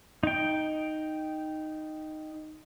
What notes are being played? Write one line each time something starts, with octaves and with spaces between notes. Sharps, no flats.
D#4 G5